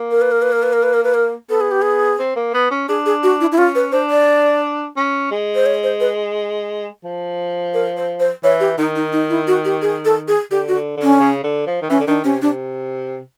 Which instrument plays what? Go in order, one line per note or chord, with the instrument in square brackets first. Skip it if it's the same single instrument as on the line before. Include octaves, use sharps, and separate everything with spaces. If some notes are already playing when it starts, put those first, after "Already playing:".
Already playing: [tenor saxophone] A#3
[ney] A#4
B4
A#4
B4
A#4
B4
A#4
B4
A#4
B4
A#4
[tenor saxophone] B3 [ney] A4
[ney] G#4
G4
G#4
[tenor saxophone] C4
A#3
B3
C#4
[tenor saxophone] D4 [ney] G#4
[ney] G#4
F#4
E4
E4
[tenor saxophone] C#4 [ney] F4
[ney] B4
[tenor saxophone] D4 [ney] C5
[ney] D5
[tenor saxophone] C#4
G#3
[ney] C5
C#5
C5
B4
[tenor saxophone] F3
[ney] A#4
C5
C5
[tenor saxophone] E3 [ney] C#5
[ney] G4
[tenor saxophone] D#3 [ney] D#4
[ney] D#4
D#4
E4
F#4
G4
G#4
A4
G#4
[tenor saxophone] D3 [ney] G4
[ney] F#4
[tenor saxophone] D3
D3
[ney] C#4
[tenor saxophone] C#3
D3
F3
D#3
[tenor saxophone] E3 [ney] C#4
[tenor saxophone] D3
[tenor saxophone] D#3 [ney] D4
[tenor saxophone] C3 [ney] C#4
[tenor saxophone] C3 [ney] D4